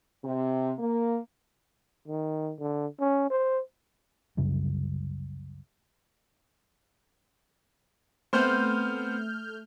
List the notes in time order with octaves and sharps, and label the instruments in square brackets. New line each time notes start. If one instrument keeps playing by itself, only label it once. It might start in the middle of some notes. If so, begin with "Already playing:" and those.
[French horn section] C3
A#3
[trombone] D#3
D3
C#4
C5
[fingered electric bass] C2 F#2 C#3 G3
[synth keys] A3 F6 G6 [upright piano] B3 C4 C5